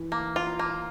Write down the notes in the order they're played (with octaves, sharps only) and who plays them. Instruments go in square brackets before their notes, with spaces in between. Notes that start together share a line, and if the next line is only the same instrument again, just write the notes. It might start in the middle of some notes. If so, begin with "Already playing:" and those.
Already playing: [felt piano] E3
[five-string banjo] A#3
F4
A#3